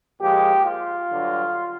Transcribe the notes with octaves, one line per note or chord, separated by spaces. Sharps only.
A#2 F3 G#3 G4
F4
G2 D3 F#3